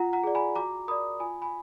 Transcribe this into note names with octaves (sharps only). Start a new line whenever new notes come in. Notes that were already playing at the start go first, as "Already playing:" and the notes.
Already playing: F4 F#5 A#5
F#5 A#5
G#4 D5
G#5 B5
F#4 A#5 D6
A#4 D5 B5 D#6
F4 G#5 B5
G#5 B5